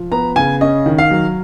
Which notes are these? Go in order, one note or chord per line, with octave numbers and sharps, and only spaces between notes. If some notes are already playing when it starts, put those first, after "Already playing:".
Already playing: F3
B3 A#5
C#3 G#5
C#4 D#5
D#3
F5
F#3